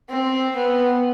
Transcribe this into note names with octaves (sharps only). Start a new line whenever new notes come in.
C4
B3